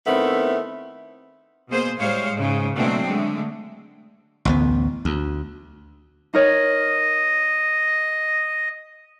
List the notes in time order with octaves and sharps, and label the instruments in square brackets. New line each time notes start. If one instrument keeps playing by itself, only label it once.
[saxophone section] D#3 A3 B3 C4 E4
[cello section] B2 A#3 G#4 C5
A2 G3 G#3 C5 C#5 F5
G#2 C#3
B2 F#3 G#3 A3 C4 D4
D3 G#3 A3
[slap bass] A1 D2 B3
D2
[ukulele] D#4 A#4 C#5 [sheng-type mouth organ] D#5